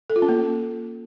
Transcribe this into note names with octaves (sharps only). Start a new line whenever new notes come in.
A4
F4
C#4
A#3